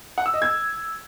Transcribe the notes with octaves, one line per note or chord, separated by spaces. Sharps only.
F#5
E6
D#5
G#6